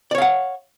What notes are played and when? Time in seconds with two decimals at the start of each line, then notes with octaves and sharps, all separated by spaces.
0.11 D5
0.15 C#5
0.18 F5
0.22 F#5